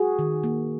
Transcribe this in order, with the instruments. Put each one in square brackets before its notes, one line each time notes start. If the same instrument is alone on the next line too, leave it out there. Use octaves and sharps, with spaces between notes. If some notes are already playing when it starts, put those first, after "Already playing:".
Already playing: [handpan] F#4 G#4
D#3
A#3